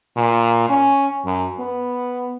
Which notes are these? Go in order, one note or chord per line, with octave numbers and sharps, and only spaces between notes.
A#2
C#4
F#2
B3